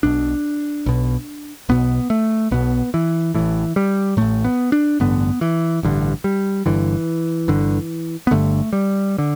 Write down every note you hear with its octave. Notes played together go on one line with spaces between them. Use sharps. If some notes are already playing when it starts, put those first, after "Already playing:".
B1 B2 D4
B1 B2
B1 B2 B3
A3
B1 B2 B3
E3
A1 A2 E3
G3
A1 A2 A3
B3
D4
A1 G2 D3 B3
E3
A1 G2 D3
G3
G1 G2 D3 E3
G1 G2 D3
B3
G1 G2 D3 A3
G3
D3